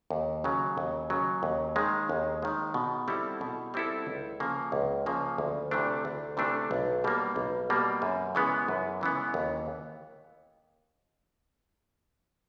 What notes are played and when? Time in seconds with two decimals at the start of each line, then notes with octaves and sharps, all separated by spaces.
0.11 D#2
0.44 C#3 F#3
0.78 D#2
1.10 C#3 F#3
1.43 D#2
1.76 D#3 G#3
2.09 D#2
2.42 D#3 G#3
2.74 B2
3.08 G3 C4 E4 A4
3.41 B2
3.74 G3 C4 E4 A4
4.07 C#2
4.40 C#3 F3 A#3
4.72 C#2
5.06 C#3 F3 A#3
5.38 D2
5.71 C3 E3 A3 D4
6.05 D2
6.37 C3 E3 A3 D4
6.71 B1
7.04 B2 G3 A#3
7.36 B1
7.70 B2 G3 A#3
8.02 F#2
8.35 C#3 E3 G#3 B3
8.68 F#2
9.01 C#3 E3 G#3 B3
9.34 D#2